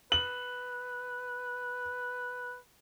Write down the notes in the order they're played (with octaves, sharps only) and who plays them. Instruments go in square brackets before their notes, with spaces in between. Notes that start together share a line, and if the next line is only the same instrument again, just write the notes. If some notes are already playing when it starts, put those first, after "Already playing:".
[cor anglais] B4 [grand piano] F#7